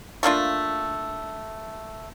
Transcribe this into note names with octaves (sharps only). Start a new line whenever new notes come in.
A3 A#3 D4 F4